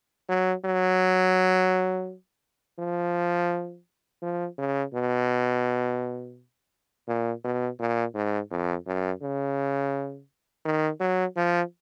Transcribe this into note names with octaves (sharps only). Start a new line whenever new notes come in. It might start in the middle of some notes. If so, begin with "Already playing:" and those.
F#3
F#3
F3
F3
C#3
B2
A#2
B2
A#2
G#2
F2
F#2
C#3
D#3
F#3
F3